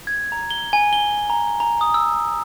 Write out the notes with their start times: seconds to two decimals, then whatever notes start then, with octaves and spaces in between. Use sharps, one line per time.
0.07 G#6
0.32 A#5
0.51 G7
0.73 G#5
0.93 G7
1.30 A#5
1.60 A#5
1.81 D#6
1.94 E6